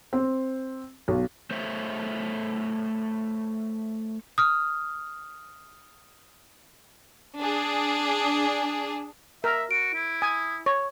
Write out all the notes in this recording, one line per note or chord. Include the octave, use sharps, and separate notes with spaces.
C4
B1
A3 C5 C#5 E5
D#6 F6
D4 G#4
A#4 E5
F#4 D7
E4
G#5 D#6
C#5 C#6